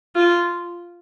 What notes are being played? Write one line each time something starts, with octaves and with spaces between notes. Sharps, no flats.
F4